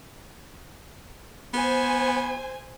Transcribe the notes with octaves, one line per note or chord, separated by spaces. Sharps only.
B3 C5 G#5